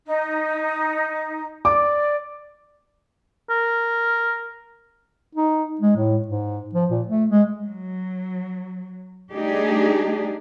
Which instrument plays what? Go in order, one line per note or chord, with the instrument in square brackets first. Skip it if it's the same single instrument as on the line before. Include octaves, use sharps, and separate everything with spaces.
[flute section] D#4
[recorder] D5 [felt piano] D6
[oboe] A#4
[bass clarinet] D#4
G#3
A2
G#2
F3
A#2
A3
G#3
[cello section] F#3
G3 A3 D4 D#4 G4 G#4